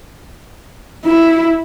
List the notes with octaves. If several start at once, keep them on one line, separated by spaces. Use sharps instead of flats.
E4